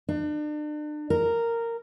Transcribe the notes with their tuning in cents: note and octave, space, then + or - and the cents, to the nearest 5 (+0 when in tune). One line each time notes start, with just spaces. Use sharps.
D4 +35
A#4 -10